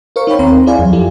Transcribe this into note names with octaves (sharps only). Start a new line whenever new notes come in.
A#4 C5 F5 C#6
D#4 C#5 F5 G5 B5 C#6
D#2 C4 A#5 C6
E4 G#4 D5 F5 G#5
F2 F#3
E4 F4 G4 A4